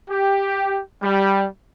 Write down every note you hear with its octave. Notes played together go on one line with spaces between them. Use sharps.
G4
G3